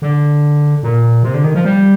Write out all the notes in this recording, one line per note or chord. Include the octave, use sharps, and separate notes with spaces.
D3
A#2
C3
D3
D#3
F3
G3